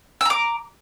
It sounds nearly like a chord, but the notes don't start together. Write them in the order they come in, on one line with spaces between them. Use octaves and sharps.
E6 A#5 D6